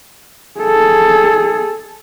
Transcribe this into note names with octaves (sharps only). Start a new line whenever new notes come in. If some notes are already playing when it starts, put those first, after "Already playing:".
G#4 A4